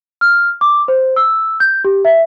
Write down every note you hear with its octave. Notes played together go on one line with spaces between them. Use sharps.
F6
D6
C5
E6
G6
G4
E5